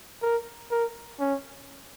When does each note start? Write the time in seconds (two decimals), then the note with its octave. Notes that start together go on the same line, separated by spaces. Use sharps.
0.22 A#4
0.71 A#4
1.19 C#4